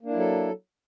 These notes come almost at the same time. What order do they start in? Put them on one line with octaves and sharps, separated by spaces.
A#3 D4 E4 F#3 A4